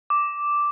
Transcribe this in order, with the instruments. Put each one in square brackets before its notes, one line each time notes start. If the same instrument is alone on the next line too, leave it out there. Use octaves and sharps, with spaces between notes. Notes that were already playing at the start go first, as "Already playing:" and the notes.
[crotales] D6